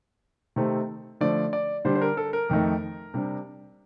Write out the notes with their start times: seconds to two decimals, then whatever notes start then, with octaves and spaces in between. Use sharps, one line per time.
0.56 C3 D#3 A3 C4
1.21 D3 F3 A3 D5
1.53 D5
1.85 D3 G3 D4 C5
1.95 C5
2.01 A#4
2.17 A4
2.33 A#4
2.49 F2 D#3 A3 D#4
3.14 C3 G3 D4